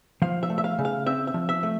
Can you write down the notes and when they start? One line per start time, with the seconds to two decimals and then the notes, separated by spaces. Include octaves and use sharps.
0.22 F3 F5
0.43 E5
0.50 A3
0.58 E5
0.64 F5
0.79 C#3
0.85 F5
1.06 C4 E5
1.27 E5
1.34 F3
1.49 E5
1.63 A3